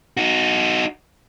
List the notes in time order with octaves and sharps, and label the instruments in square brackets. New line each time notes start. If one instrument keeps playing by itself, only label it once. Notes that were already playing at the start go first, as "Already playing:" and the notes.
[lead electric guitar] D#4 F#4